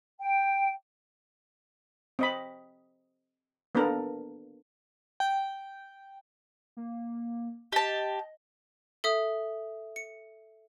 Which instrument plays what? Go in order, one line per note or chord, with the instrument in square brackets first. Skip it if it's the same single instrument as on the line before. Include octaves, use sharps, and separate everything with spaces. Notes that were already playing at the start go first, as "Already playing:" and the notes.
[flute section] G5
[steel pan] C4 D#5 B5
A#3 B3 D4 A4 A#4
[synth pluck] G5
[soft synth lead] A#3
[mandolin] G4 A5 [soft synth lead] D#5
[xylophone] A4 E5 D#6
C#7